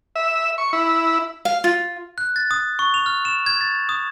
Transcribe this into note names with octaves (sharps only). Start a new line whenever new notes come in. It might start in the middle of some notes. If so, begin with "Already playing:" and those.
E5
C#6
E4
F5
F4
F#6
A6
D#6
C#6
F7
F6
E7
G#6
A6
D#6